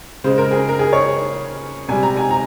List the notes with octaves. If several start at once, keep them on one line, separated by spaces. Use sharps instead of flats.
C#3 G#3 C5
A#4
G#4
A#4
G#4
C#5
C3 G3 G#5
A#5
G#5
A#5